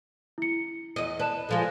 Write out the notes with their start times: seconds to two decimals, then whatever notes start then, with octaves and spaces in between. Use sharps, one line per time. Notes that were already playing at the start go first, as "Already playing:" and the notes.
0.38 E4 C#7
0.96 E2 D#5
1.20 B4 D5 A5 E7
1.49 D3 F3 G#3